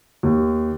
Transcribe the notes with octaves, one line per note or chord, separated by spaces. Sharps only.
D#2